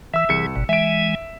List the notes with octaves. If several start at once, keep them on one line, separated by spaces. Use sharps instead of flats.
E3 E5 E6
C2 E3 G#4 C#7
G1 B2
E3 G#3 E5 G#5 D7